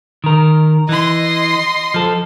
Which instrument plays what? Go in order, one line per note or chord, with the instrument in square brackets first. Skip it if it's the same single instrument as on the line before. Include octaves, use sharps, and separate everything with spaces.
[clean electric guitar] D#3 A#4
[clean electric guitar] E3 [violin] D#5 C6
[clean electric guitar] F3 A4